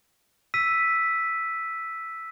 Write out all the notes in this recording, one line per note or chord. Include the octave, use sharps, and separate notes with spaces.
E6 B6 D#7